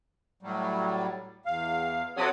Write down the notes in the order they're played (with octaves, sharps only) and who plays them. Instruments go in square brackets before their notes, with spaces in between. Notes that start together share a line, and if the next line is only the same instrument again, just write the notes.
[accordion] A2 F#3 G3
E2 F5
[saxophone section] C3 F#3 [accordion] A4 F#5 D#6